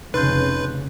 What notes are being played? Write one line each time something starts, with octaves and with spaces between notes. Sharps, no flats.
F1 C#3 D#4 B4 C6 G6